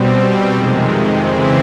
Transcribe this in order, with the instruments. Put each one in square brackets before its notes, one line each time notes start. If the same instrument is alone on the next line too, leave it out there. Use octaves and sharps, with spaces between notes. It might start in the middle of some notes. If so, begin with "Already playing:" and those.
Already playing: [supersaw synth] B2 G3 C4
F2 C3 D#3 G#3
C#3 E3 G#3 C4 E4